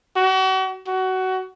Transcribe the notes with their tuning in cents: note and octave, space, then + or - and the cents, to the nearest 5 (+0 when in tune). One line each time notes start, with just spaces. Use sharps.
F#4 +40
F#4 +20